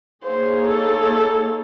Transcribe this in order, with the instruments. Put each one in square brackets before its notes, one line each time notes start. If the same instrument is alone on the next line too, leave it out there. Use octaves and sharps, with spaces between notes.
[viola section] A#3 D#4 G#4 C#5 [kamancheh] C5
[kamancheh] A4